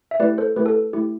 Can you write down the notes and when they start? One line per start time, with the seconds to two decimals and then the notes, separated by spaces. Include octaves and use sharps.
0.11 E5
0.20 A3 E4 G4 B4 D5
0.38 A4 C5
0.56 A3 E4 G4 B4
0.66 A4
0.93 A3 E4 G4